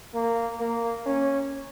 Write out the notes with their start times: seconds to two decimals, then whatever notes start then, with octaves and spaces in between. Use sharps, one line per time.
0.15 A#3
0.60 A#3
1.06 C#4